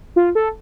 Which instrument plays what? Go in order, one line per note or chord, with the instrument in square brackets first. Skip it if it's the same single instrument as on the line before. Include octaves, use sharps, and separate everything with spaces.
[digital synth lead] F4
A4